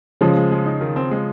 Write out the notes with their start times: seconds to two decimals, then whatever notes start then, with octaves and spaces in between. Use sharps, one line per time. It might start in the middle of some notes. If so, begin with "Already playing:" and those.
0.21 C#3 F3 G#3
0.37 G#3
0.51 G#3
0.66 D#4
0.81 D#3
0.96 C4
1.11 G#3